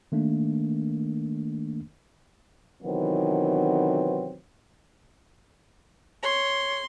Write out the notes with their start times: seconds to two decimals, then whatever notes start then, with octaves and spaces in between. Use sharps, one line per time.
0.12 D#3 A3 A#3 D4
2.83 C3 D#3 E3 F#3 B3 C4
6.23 C#5 C6